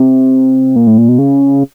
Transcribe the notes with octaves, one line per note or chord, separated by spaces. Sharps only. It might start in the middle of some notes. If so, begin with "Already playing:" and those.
Already playing: C3
A#2
A2
A#2
B2
C#3